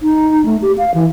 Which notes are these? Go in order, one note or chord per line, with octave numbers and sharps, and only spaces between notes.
D#4
A3
G4
F5
E3